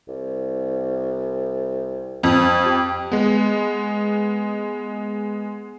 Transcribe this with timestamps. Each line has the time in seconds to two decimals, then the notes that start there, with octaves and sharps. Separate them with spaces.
0.08 C2
2.23 F2 F3
2.65 G4
3.12 G#3 B3